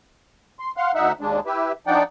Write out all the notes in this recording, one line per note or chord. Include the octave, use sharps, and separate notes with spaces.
C6
F5 F#5 C6
D2 D#4 E5 F#5
D#2 G#3 D4
E4 G4 B4 E5
F3 D4 D#4 D5 F#5 G5